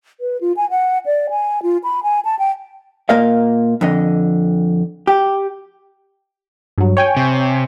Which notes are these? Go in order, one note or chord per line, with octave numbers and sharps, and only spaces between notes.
B4
F4
G#5
F#5
D5
G#5
F4
B5
G#5
A5
G5
A#2 A#3 A#4 D#5 F5
F2 D3 D#5
G4
G2 F#3
C#5 G5 G#5
C3